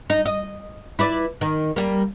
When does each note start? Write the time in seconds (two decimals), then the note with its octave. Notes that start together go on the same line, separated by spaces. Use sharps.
0.10 D#4
0.25 D#5
0.99 E4 B4 D5
1.41 D#3
1.76 G3 A#3